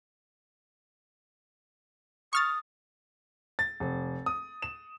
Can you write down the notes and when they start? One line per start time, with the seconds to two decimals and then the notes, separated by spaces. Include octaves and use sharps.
2.33 C#6 D#6 F6 A6
3.59 A6
3.80 F1
4.26 D#6
4.62 E7